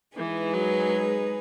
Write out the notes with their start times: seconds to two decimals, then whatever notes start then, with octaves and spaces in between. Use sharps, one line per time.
0.17 E3 G#3 D#4 G#4 B4
0.54 F#3